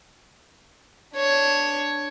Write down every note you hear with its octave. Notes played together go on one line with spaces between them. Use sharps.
D4 C#5